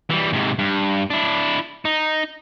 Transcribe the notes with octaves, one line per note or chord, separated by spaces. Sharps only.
E3 G3
G#2 C3
G2
D4 E4
D#4